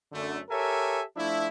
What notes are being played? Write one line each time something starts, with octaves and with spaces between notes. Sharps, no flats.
F#2 D3 A3
G4 A4 A#4 C#5 E5 G#5
F3 A3 D4 E4